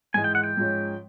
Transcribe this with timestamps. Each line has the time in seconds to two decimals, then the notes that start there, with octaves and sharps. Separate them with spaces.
0.14 G#2 E3 G#3 G#5
0.24 G5
0.35 F#5
0.44 G5
0.57 G#2 F3 G#3 C#4